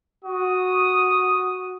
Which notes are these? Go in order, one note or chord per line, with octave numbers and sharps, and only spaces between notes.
F#4 D#6